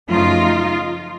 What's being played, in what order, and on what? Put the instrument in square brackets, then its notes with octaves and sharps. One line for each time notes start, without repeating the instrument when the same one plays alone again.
[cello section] F#2 C#3 F3 A3 D#4 F4